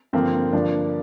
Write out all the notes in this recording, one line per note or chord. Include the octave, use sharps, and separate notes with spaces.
G2 D3 F3 A#3 C4
G2 D3 F3 A#3 D4